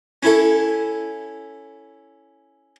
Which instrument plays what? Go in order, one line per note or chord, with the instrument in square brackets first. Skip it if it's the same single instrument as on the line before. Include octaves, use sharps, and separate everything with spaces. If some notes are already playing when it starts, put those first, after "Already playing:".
[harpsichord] C#4 E4 A4